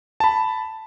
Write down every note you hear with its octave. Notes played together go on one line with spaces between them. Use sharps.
A5 B5